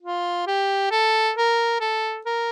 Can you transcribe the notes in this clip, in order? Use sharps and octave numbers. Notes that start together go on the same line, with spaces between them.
F4
G4
A4
A#4
A4
A#4